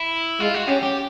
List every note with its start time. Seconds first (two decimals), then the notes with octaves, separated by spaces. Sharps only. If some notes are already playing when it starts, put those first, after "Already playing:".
Already playing: E4
0.40 G#3 F4
0.54 F#4
0.68 C#4 G4
0.83 G4